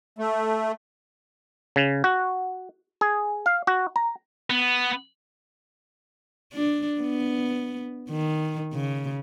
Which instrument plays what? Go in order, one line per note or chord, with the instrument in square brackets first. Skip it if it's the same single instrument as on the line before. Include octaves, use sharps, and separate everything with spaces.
[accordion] A3
[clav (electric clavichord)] C#3
F#4
G#4
F5
F#4
A#5
[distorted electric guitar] B3
[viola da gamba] D4
B3
D#3
C#3